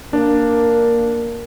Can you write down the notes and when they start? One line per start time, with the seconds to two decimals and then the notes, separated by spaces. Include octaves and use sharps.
0.13 A#3 D4 D5